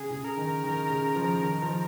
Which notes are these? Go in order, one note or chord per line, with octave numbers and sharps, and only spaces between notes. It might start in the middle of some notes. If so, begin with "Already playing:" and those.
Already playing: C#3 G#4
C#3
A#4
D#3
D#3
C#3
F3
D#3
F3